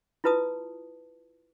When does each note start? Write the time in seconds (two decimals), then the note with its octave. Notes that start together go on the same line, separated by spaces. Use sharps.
0.24 E4 F4 B4 A5 D#6